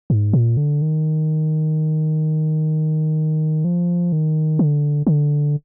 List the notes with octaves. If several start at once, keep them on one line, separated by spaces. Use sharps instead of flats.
G#2
A#2
D3
D#3
F3
D#3
D3
D3